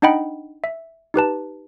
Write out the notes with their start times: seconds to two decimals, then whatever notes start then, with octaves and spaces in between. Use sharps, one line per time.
0.02 D4 D#4 D#5 F#5 G5 B5
0.64 E5
1.14 D#4 G4 B4 A5